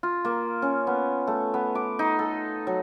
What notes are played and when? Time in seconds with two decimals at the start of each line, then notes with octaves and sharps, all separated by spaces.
0.03 F4
0.25 A#3
0.62 C#4
0.87 B3
1.27 A3
1.54 B3
1.75 D6
1.99 D#4
2.19 A4
2.67 F#3